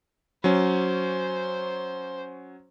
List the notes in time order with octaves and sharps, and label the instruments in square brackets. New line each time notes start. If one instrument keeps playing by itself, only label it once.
[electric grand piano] F#3 C#4 [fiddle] C5